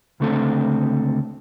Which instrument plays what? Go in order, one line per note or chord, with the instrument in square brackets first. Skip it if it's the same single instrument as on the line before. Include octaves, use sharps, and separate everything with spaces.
[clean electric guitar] C#2 D3 A3 C4 A4